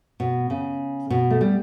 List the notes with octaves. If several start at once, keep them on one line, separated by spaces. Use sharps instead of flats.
B2
C#3
B2
A3
G3